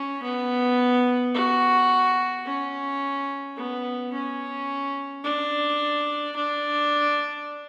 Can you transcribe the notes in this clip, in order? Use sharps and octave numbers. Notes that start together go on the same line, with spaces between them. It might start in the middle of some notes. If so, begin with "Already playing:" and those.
Already playing: C#4
B3
F#4
C#4
B3
C#4
D4
D4